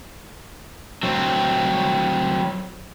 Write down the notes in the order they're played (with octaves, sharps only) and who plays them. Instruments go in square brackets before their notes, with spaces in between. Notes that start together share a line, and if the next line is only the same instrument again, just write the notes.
[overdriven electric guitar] F#3 C4